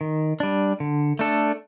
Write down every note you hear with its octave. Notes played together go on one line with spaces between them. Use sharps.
D#3
G3 D4
D3
A3 D4 A4